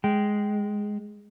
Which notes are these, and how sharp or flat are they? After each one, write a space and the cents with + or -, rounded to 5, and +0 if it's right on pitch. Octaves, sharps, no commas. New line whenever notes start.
G#3 +0 G5 -15